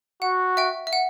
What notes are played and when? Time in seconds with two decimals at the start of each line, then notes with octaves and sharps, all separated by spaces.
0.22 F#4 F#5
0.57 E5 G5
0.87 E5
0.93 F#5